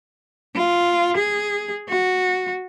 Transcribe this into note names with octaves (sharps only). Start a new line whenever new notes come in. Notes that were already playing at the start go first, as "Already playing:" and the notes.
F4
G#4
F#4